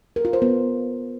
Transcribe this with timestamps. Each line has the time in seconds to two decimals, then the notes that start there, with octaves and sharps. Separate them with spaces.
0.16 A#4
0.25 F4
0.33 C5
0.42 B3